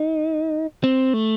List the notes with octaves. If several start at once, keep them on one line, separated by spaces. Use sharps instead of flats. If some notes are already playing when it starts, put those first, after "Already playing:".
Already playing: D#4
C4
A3